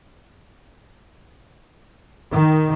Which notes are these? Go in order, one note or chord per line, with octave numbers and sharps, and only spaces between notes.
D#3